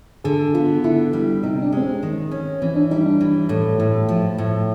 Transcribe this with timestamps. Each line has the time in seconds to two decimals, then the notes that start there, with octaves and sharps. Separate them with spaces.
0.24 D3 G#4
0.54 B3 F4
0.84 D3 E4
1.13 G3
1.43 C3 D#4
1.62 D4
1.73 G#3 C4
1.82 C#4
2.03 D#3
2.31 C#4
2.62 E3 C4
2.75 D4
2.91 G3 D#4
3.06 D4
3.21 E3
3.49 A2
3.80 A2
4.09 F3
4.38 A2